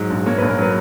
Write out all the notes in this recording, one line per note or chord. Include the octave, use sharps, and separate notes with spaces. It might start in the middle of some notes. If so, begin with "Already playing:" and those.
Already playing: G#2 F#3
A#1
A#3 C#5
B4
A#1
A#4
F#3 B4